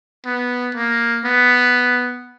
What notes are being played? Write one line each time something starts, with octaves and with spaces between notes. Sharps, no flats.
B3
A#3
B3